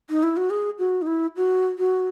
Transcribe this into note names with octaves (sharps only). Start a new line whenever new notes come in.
D#4
E4
F#4
G#4
F#4
D#4
E4
F#4
F#4